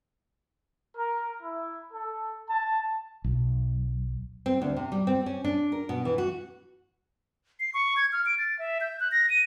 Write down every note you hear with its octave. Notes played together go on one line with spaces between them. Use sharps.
A#4
E4
A4
A5
B1
C4
D2
C3
G3
C4
C#4
D4
A#4
B2
E3
F#4
C7
C#6
G#6
F6
D7
A6
E5
G6
F#6
A#6
D#7